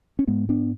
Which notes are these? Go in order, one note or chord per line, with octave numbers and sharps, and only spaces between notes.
C#4
G#2 G#3 B3
B3 D4